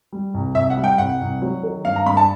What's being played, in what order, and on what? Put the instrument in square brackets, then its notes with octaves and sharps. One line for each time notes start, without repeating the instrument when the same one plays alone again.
[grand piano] G3
C2
[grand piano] C2 [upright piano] E5
[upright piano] F#5
[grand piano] G3
[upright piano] G5
[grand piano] C2 [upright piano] F#5
[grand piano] C2
F#3
D#3
[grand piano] G2 [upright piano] F5
[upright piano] A#5
[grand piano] G2 [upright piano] B5
[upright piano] A5